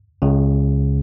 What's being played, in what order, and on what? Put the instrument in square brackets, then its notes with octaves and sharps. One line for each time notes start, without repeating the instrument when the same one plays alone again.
[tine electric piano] C#2 C#3